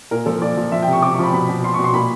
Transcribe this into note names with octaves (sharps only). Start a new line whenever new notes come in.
A#2 A#4
F3 A4
A#2 D5
F3
F3 E5
G5
C3
C#6
C3 D6
C#6
F3 B5
B2 B5
B2
B2 C6
C#6
B2
C6
A#2 B5